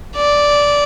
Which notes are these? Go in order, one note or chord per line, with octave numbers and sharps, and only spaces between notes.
D5